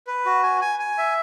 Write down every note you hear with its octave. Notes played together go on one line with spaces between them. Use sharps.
B4
F#4
G#5
G#5
G#5
E5